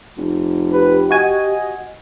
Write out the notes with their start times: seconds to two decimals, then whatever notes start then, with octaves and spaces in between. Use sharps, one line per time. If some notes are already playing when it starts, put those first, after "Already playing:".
0.18 F1
0.72 G4 B4
1.11 F#4 D#5 G#5